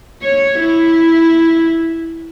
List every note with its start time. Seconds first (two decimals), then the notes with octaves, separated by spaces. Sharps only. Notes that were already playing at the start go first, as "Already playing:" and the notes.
0.23 C#5
0.61 E4